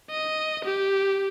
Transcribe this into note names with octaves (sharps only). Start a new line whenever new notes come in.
D#5
G4